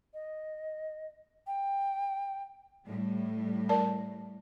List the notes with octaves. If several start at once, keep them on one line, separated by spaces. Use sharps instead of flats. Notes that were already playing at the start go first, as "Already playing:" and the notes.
D#5
G5
A2 G3
A#4 D5 A5